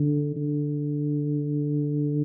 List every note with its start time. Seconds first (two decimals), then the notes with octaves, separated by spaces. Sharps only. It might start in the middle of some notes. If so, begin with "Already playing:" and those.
Already playing: D3
0.36 D3